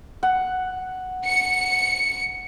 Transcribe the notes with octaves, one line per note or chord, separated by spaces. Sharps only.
F#5
C#7